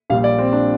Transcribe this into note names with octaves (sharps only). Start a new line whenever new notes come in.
A#1 A#2 G3 F5
D5
C4
D4